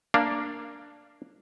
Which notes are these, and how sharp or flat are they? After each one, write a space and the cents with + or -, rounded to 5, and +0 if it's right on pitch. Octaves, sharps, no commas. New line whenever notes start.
A#3 +0 D4 +0 F5 -10